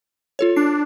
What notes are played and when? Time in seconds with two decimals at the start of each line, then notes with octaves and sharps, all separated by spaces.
0.39 F4 A4 C#5
0.56 D4 C7